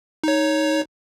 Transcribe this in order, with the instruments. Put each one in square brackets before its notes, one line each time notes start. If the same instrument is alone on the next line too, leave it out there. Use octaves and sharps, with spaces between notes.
[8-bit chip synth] D#4 C#5